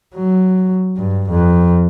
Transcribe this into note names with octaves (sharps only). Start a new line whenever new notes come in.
F#3
G2
F2